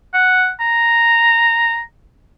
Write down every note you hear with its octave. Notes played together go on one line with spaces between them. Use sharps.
F#5
A#5